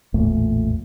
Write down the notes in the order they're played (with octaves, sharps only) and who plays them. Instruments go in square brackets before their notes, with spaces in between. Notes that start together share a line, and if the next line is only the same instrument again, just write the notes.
[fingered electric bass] A1 E2 A#2 A3